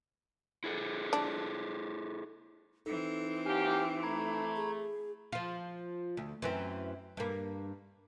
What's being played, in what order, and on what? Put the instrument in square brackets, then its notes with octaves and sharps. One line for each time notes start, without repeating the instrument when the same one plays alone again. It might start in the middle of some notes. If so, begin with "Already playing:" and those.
[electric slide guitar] E4 G#4 A4
[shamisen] D4
[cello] E3 C4 [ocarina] D#4 [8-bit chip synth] A4
[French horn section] F#3 A#3 G4 [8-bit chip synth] G#5 F6
[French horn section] A3 [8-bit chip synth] A#5 B5 G#6
[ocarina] G#4
[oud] F3 F4
D2
F#2 E3 C4
G2 A#3